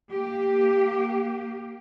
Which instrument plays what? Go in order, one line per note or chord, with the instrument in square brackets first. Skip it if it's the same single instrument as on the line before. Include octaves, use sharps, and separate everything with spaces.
[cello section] A#3 G4